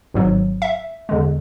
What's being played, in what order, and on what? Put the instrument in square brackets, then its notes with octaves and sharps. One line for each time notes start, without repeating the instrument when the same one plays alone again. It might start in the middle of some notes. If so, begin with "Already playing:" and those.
[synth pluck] G#1 G#2 F#3
E5
E2 D3 G#3